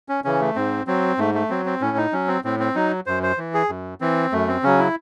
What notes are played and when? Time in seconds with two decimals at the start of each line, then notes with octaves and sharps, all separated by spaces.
0.09 C#4
0.24 C#3 E3 C#4
0.40 A3
0.55 G#2 C4
0.87 F#3 C4
1.18 G#2 A3
1.34 A3
1.50 F#3 C4
1.66 C4
1.81 A2 C#4
1.97 D#4
2.12 F#3 C#4
2.28 C4
2.44 A2 C4
2.59 C4
2.75 F#3 D#4
3.06 F#2 C5
3.23 C5
3.38 E3
3.54 G#4
3.69 F#2
4.01 E3 C4
4.32 F#2 A3
4.48 C4
4.63 C#3 F#3 C#4
4.79 E4